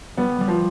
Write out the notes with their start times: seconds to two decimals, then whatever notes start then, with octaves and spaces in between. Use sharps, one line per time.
0.17 G3 B3
0.41 G3
0.48 F3